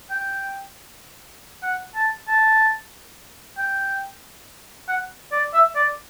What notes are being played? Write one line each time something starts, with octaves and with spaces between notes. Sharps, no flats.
G5
F#5
A5
A5
G5
F#5
D5
E5
D5